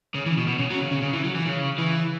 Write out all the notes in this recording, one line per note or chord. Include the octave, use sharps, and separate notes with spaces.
C#3
E3
B2
B2
C#3
F#3
C#3
C#3
C#3
E3
F#3
E3
C#3
E3